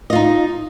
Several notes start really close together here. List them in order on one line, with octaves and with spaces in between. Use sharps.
D#5 F4 D#4